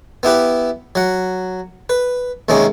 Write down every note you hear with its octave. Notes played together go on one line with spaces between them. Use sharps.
B3 E4 G4 B4
F#3 F#5
B4
D#2 C3 G#3 A#3 C#4